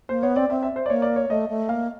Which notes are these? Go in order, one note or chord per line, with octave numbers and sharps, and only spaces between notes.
A#3 C5
B3 C#5
C4 D5
C4 E5
E5
C5
D5
A#3 C#5
D5
C#5
A3 D#5
A3
A#3 F5